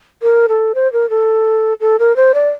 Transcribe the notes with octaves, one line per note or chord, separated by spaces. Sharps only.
A#4
A4
C5
A#4
A4
A4
A#4
C5
D5